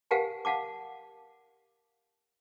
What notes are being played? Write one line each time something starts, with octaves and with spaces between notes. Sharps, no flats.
G4 A#4 F5 F#5 G#5 A5
F5 F#5 A5 D6